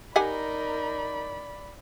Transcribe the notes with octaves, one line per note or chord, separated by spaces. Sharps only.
D#4 G4 A#4 D5 F#5 G#5 B5